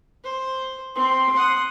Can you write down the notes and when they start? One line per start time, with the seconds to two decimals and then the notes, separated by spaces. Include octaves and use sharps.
0.24 C5
0.96 C4 C6
1.37 F#5 D#6